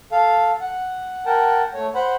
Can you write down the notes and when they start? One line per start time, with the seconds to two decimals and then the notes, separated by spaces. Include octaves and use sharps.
0.12 A4 F5
0.61 F#5
1.26 A#4 F#5 G5 A5
1.74 A3 C#5
1.95 C5 F#5 B5